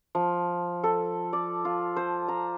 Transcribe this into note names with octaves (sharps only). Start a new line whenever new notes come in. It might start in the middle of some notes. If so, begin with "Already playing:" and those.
F3
A4
D5
F4
C5
A#5